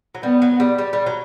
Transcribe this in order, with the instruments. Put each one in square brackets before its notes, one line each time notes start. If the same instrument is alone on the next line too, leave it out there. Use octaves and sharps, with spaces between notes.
[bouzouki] F#3
[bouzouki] G3 [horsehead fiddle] B3
[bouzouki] F#3
G3
G3
G3
F#3